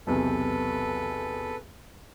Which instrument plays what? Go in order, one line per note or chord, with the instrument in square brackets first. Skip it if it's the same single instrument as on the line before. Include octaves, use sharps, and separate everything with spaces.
[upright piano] B1 E2 C3 [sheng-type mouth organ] A4 B4